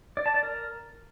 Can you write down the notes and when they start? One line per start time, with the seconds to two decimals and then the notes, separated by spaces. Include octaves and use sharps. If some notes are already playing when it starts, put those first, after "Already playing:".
0.17 D5
0.26 A5
0.34 D5
0.43 A#4